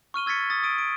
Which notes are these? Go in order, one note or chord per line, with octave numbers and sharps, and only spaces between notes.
C#6 F6 D#7 G7
E6 G#6 A6 B6 C#7
D#6 A6
D#6 D7 D#7
D7